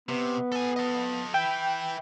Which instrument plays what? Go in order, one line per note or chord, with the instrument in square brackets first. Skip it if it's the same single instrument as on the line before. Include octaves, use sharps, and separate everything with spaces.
[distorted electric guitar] C3 [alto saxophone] B3
[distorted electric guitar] A4 G#5
A4 D#5
[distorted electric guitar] B4 E5 [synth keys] G5